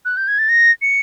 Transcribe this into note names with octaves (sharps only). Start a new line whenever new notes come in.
F#6
G6
G#6
A6
A#6
C#7